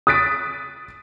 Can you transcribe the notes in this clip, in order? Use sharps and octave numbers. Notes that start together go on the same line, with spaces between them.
D#6 F#6 A6 B6 D7